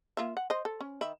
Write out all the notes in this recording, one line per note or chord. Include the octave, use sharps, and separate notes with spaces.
A#3 F4 E5
F#5
C5 D#5
A4
C#4
D#3 E5 B5